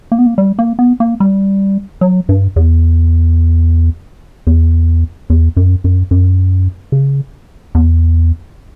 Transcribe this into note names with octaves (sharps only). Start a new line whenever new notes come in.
A#3
B3
A#3
G3
A#3
B3
A#3
G3
F#3
G2
E2
E2
E2
F#2
F#2
F#2
C#3
E2